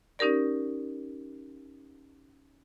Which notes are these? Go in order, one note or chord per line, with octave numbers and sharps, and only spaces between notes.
C#4 D#4 G4 A#4 D5